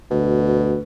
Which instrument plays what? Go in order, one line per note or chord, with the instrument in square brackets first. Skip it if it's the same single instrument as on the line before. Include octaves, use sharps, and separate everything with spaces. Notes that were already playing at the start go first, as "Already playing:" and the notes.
[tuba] D2 [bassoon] B2